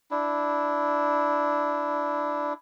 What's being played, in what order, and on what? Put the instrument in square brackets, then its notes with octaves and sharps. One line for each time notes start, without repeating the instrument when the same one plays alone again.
[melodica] D4 E4